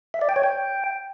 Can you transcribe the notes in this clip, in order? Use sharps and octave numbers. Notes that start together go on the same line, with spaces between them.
E5
D5
G5
C#5
G5